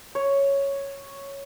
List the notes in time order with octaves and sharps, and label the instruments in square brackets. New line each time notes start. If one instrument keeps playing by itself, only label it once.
[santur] C#5